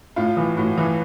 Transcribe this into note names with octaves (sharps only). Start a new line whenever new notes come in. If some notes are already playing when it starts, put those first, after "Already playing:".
A2 F4
E3
A2 F#4
E3